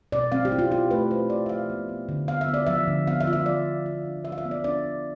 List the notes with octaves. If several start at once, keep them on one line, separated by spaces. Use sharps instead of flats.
B2 D5
C4 F5
G4
E4
F4
E4 G4
A3 B4
C4 C5
B2 D5
E5
F3 F5
B3
B3
D3
B3 F5
E5
B3
D5
F3 E5
D3
B3 F5
E5
F4
E5
F3 D5
B3
F4
D4
F4 E5
F5
E5
B3
D5
D4 D5